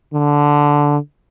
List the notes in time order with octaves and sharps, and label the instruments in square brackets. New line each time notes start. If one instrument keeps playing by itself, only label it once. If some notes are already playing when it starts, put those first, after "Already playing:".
[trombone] D3